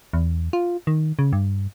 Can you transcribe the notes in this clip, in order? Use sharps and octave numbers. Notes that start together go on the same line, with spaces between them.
E2
F4
D#3
C#3
G2